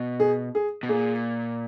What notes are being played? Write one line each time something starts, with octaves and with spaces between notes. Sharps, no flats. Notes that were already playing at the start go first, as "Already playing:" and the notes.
Already playing: B2
G#4
G#4
B2
A#2 G#4